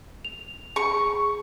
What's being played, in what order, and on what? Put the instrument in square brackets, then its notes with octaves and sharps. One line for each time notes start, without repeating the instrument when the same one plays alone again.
[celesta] F7
[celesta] G#4 [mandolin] C#6